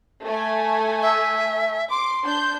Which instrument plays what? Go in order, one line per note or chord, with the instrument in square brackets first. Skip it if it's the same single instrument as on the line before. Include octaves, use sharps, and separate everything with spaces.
[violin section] A3 G#5
[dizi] E5
[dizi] C6 [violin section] D6
[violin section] D4 G6